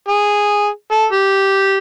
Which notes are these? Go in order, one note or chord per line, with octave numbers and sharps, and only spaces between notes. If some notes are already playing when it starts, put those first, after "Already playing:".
G#4
A4
G4